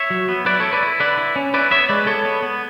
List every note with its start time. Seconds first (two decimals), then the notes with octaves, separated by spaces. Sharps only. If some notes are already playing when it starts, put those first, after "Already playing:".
Already playing: C#5 E5
0.10 F#3
0.28 B3
0.46 E4 B4 D5
0.60 E4 A4 C#5
0.73 B4 D5
0.83 E4
1.00 D3 B4 D5
1.18 E4
1.36 C#4
1.54 E4 B4 D5
1.71 B3 C#5 E5
1.89 G#3 B4 D5
2.07 B3 A4 C#5
2.25 B3
2.42 B3